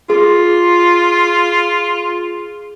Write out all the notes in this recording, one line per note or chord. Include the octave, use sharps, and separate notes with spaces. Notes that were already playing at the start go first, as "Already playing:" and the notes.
F4 G#4